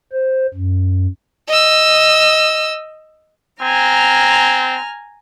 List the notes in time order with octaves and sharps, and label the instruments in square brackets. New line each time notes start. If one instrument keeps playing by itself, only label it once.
[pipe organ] C5
F#2
[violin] D#5 E6
[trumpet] C4 [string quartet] G#5 A#5 F6